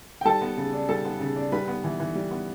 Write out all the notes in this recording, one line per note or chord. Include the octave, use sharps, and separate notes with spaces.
G5
G3 A4 A5
B3
C#3
D4
G3 A4 A5
B3
C#3
D4
G3 B4 B5
B3
E3
E3
G3
B3